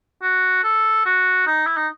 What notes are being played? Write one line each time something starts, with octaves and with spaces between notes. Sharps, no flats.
F#4
A4
F#4
D#4
E4
D#4